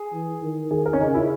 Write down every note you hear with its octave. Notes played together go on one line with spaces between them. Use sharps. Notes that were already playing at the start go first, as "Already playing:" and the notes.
Already playing: G#4
E3
D#3
D#3 G#4
A#4
C#4
C#3 D#4
E4